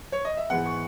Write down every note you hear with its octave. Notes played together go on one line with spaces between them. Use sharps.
C#5
D#5
E5
G#2 E3 G#3 B3 F#5
C#6